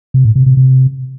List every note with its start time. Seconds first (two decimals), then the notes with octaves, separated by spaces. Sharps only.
0.14 C3
0.25 A2
0.36 C3
0.46 C3
0.57 C3